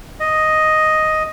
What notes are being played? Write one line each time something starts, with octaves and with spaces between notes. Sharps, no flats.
D#5